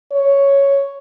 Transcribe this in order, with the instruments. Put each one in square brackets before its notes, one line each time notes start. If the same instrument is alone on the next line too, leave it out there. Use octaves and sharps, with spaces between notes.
[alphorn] C#5